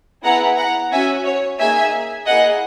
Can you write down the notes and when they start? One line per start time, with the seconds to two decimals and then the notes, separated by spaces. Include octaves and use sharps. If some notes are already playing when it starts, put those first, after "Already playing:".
0.24 B3 E4 G#4 F#5 A#5
0.58 F#5 A#5
0.91 C#4 F#4 E5 G#5
1.25 C#5
1.59 A#3 D#4 G#4 E5 G#5
2.27 A#3 E4 G#4 D#5 F#5